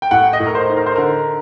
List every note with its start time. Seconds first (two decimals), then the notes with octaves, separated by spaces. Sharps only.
0.02 G5
0.11 A2 F#5
0.33 D#5
0.40 A2
0.46 A#4
0.55 C5
0.69 D#4
0.77 A#4
0.86 C5
0.96 D3 A#4